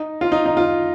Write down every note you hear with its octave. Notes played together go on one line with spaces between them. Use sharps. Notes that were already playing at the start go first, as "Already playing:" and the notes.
Already playing: D#4
F4
D#4
D#4
F4